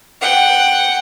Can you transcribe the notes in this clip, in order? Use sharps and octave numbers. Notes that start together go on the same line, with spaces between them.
F#5 G5